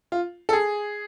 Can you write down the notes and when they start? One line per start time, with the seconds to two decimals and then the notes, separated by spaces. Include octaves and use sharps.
0.12 F4
0.49 A4
0.53 G#4